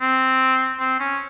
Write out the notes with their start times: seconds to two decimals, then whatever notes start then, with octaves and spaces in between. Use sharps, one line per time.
0.01 C4
0.80 C4
1.00 C#4